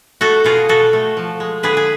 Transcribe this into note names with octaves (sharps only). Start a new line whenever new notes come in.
A3 F#4 A4
B2 F4 G#4
B2 F#4 A4
A3
F3
G#3
D3 G#4 B4
G#4